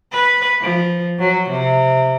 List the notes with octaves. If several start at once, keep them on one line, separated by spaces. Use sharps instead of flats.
B4
F3
F#3
C3